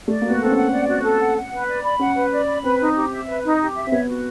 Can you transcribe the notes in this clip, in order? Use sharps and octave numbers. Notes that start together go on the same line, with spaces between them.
A3 D5
A#3 F#4
B3
C4 A4
C#4 F#5
D5
F#4
A4
F#5
F#5
B4
D5
B5
C#4 F#5
B4
D5
B5
C4 B4
D#4
G4
E5
B4
D#4
G4
E5
C4
B3 C#5
F#4